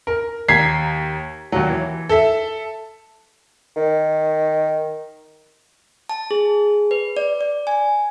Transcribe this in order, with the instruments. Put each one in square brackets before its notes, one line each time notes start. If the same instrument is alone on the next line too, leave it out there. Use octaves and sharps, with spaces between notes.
[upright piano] A#4
D#2 A#5 G#6 B6 C7
D#2 F#3
E3
A4 E5
[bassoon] D#3
[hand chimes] A5
G#4
B4
D5
D5
G#5